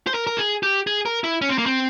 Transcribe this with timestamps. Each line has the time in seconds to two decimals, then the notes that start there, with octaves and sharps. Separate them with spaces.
0.07 C5
0.14 A#4
0.27 A#4
0.38 G#4
0.63 G4
0.87 G#4
1.06 A#4
1.24 E4
1.42 C#4
1.49 C4
1.58 A#3
1.66 C4